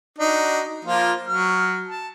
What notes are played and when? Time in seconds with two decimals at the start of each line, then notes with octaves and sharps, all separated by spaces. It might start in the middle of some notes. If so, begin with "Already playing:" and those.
0.19 D4 D#4 F#4
0.85 F3 A#3 F4
1.27 F#3 F6
1.88 A5